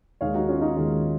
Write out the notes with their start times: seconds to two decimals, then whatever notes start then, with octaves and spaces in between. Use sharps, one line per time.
0.21 D#2 D#3 G#3 C#5 F5
0.35 D#4 F#4
0.48 C#4 F4
0.62 D#4 F#4
0.75 D#2 D#3 G#3 F4 G#4